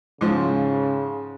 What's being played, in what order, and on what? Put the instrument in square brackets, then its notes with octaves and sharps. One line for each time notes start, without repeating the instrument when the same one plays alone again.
[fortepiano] G#2 F3 [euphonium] C#3